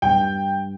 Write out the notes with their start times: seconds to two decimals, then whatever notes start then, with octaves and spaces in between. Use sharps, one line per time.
0.02 G2 G5